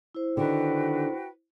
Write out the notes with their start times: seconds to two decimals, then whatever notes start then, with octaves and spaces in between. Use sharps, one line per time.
0.15 E4 C5
0.37 D3 D#3 F#4 B4 G5